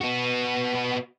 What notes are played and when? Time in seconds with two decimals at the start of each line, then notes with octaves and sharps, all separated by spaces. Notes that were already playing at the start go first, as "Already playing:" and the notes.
0.01 B3 F#4